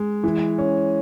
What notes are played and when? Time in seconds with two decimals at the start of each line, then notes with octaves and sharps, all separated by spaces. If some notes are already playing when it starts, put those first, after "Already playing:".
Already playing: G#3
0.24 E3
0.58 C#4